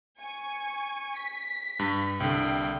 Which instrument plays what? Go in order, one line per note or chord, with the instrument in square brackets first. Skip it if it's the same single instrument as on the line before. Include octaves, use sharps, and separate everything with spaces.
[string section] G#5 C#6
B6
[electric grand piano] G2
[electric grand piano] C2 D3 [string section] G5